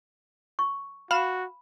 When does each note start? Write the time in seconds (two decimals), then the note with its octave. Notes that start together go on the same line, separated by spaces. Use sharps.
0.59 C#6
1.11 F#4 F5 B5 E7